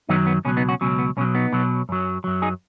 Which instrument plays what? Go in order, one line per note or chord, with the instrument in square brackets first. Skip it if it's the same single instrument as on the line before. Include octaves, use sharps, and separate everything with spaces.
[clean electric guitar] F#2 D#3 F#3 B3 D#4
B3
C#2 B2 F#3 C#4
B3 D#4
C#4 F#4
C#2 B2 F#3 C#4
B3
B1 B2 F#3 C#4
B3 D#4
B1 B2 F#3
F#2 F#3
F#2 F#3
D#4 G#4